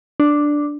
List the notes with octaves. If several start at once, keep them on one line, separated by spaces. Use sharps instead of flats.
D4